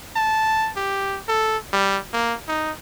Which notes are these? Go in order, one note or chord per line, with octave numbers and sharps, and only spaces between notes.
A5
G4
A4
G3
A#3
D#4